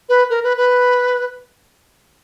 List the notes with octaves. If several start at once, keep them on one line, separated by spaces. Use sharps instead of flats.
B4
A#4
B4
B4